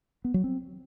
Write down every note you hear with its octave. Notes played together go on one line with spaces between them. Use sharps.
B3
F#3
C4